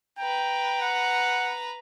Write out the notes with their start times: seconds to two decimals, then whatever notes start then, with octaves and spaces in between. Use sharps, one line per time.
0.19 B4 G5 A#5
0.82 F#5